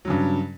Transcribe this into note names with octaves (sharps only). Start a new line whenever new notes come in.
G2 C#3 F#3